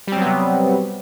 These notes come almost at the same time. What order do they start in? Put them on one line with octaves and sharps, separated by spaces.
G3 C4 F#3 B3 C3